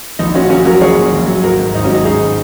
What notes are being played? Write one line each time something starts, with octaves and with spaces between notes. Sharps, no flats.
A#1 D#4
A#2 C#4 F#4
A#1 C#4 F#4
F#3 F#4 A#4
A#1 G#4 C#5
A#2
A#1
F#3
G#1 F#4 A#4
G#2
G#1 D#4
C#4 F#4
F#3 D#4
G#1 D#4 G#4